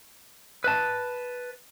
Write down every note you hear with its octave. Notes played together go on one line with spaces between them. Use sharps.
B4 A5